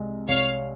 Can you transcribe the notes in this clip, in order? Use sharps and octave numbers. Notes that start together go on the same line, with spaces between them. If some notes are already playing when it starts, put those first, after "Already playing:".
Already playing: C2 G#3
C2 C#5 F5